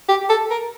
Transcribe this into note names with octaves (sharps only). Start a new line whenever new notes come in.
G4
A4
A#4